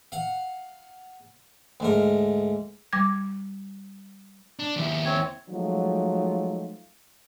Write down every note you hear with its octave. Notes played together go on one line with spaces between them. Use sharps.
F5 F#5
D2 G#2 A#4
G3 D6 G#6
D4
D#2 E4
C4 C#5
F3 F#3 G#3 A3 D#4 F4